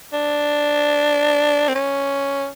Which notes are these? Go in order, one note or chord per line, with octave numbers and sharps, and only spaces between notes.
D4
C4
C#4